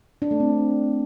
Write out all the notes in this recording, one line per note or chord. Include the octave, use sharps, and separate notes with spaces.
D4
A3
C4